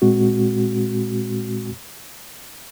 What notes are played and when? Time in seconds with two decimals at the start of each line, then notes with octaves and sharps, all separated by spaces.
0.02 A#2 G#3 C4 F#4